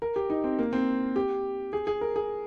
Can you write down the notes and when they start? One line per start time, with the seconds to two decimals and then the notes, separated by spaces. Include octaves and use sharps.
0.02 A#4
0.16 G4
0.30 D#4
0.44 C4
0.59 A#3
0.73 C4
1.16 G4
1.73 G#4
1.87 G#4
2.01 A#4
2.16 G#4